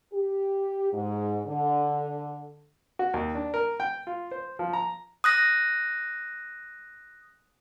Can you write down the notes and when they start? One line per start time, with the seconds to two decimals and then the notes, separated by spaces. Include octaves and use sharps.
0.14 G4
0.93 G#2
1.47 D3
2.99 F#4
3.14 D#2
3.35 D4
3.54 A#4
3.80 G5
4.07 F4
4.31 C5
4.59 F3
4.73 A#5
5.24 D#6 F#6 A#6